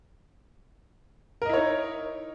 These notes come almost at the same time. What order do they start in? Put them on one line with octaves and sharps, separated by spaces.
A#4 D#5 E4 C#5 D#4